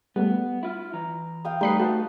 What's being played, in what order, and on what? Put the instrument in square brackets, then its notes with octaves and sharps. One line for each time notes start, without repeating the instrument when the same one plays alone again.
[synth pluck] G3 A3 [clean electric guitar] B3
[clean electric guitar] E4 F4
E3 A#5
[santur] F5 G5 D#6
[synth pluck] G3 B5 C7 [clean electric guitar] A3 A4 B4 [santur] D#4
[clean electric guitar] A3 B4 [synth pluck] F#4 [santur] A5